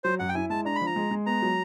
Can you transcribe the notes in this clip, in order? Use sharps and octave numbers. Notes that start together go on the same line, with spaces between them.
F#3 C5
F#2 F#5
G5
E4 G#5
G#3 A5
D4 A#5
B5
F3
A#5
G#3
G#3
B3 A#5
F#3